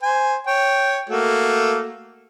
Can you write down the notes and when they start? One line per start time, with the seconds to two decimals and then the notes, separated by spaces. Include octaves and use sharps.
0.02 C5 G#5
0.47 C#5 G5
1.09 A3 A#3 F#4